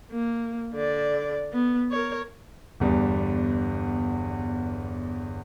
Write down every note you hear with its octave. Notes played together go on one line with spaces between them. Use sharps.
A#3
D3 D5
B3
A#4 C#5
G1 E2 G3